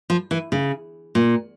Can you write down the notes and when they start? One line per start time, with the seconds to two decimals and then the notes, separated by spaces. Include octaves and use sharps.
0.10 F3
0.31 E3
0.52 C#3
1.15 A#2